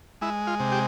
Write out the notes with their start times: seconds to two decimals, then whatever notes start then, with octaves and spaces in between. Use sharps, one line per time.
0.21 G#3 E4
0.47 F4
0.60 C3
0.72 G4